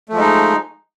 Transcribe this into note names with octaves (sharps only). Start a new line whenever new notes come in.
F3 G#3 A3 D#4